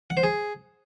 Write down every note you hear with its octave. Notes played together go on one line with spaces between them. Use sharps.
F#5
C5
G#4